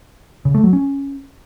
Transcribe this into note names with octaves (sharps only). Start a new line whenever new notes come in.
C#3
A3
F#3
C#4